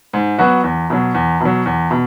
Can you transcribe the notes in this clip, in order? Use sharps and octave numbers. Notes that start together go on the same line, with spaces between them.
G#2
F#3 B3 F#4
E2
B2 F#3
E2
B2 F#3
E2
B2